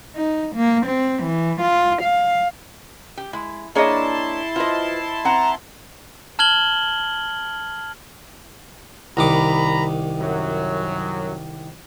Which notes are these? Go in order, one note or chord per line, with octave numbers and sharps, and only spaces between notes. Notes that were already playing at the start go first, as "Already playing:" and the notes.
D#4
A#3
C4
E3
F4
F5
G4
G#3 E4
A#3 D4 E4 G#4 C#5 D#5 A5 C6
F4 B4 C5 D#5
C4 F#5 A#5
A5 F6 G#6 F#7 G7
C2 D#3 A#5 B5 D6
F#2 F#3